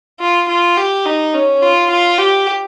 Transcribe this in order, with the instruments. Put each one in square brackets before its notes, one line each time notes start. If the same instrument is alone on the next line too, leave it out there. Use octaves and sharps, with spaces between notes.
[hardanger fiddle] F4
F4
G4
D#4
C#4
F4
F4
G4